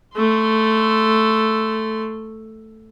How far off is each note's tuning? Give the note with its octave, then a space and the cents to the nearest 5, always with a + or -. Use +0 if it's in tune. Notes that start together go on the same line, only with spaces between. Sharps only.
A3 +0 C6 -25